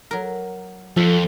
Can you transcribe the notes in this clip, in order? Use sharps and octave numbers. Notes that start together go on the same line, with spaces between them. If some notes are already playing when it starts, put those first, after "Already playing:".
F#3 A#4
F2 F3 A4